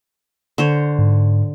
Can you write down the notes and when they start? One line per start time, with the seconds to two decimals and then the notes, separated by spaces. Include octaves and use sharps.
0.58 D3 C5 C#5
0.99 G#2